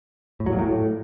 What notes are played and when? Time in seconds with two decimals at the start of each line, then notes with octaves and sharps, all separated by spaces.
0.40 A2
0.46 F#3
0.53 A#2
0.59 A2